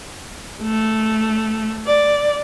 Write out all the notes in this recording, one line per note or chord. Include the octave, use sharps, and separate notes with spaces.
A3
D5